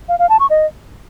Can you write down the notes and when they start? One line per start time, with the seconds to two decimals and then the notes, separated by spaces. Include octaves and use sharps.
0.09 F5
0.19 F5
0.29 A5
0.40 C#6
0.50 D#5